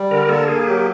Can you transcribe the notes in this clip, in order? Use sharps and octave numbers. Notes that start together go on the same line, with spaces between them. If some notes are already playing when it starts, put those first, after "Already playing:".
Already playing: G3
D3 A#4
A#3 A4
A#3 G#4
F#3 G4